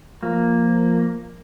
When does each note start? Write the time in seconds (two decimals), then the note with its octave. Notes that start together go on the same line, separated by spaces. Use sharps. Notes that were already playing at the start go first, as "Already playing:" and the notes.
0.23 F3 A#3